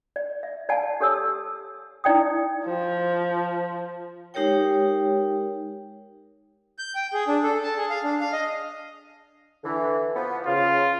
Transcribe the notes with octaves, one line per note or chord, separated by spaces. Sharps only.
D5
E5
D5 F5 F#5 G#5 A5
G4 A4 C#5 A5 E6
D#4 E4 D5 G5 D#6
F3
G#3 D#4 G4 A#4 C#5 G5
G6
G5
G#4
D4
A4
A5
G#4
F5
D4
F5
D#5
D3 E3
F3 B3
C#3 F4